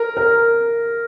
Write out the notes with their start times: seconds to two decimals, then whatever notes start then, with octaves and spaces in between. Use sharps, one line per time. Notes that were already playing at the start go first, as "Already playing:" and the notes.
Already playing: A#4
0.17 A#4